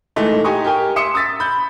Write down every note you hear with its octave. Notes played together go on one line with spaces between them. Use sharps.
A#2 E3 G#3 A3 D#4
D#4 G4 G#5 A#5 C#6 D#6
G4 A#4 G5 G#5
E5 C6 D6 D#6 C#7 E7
A#5 D#6 E6 A6 B6
B5 G6